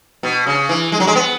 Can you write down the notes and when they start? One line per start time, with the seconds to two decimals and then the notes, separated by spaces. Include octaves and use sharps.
0.23 B2
0.47 C#3
0.69 E3
0.92 G#3
1.00 F#3
1.07 G#3
1.15 B3